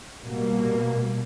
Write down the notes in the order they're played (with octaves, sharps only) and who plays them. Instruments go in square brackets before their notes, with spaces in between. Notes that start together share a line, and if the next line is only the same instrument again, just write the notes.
[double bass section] B2 G3 A#3